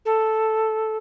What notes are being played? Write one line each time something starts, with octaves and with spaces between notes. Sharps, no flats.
A4